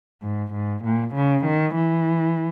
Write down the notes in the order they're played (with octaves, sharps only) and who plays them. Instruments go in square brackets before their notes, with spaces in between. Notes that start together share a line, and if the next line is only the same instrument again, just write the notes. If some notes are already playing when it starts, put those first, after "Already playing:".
[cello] G#2
G#2
A#2
C#3
D#3
E3